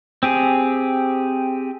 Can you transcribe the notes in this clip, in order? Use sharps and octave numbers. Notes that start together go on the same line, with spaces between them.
C4 G4 G#4